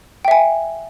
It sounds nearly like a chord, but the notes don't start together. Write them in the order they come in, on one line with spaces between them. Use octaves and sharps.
G5 E5 G#5